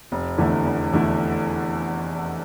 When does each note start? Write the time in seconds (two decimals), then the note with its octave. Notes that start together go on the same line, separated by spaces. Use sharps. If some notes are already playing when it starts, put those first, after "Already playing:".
0.12 F1
0.38 E2 D3 A3 E4
0.65 F1
0.93 E2 D3 A3 E4